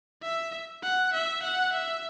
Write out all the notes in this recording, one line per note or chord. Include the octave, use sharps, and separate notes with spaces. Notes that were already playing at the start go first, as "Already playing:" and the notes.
E5
F#5
E5
F#5
E5